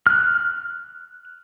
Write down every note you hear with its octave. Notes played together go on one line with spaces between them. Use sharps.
F6 F#6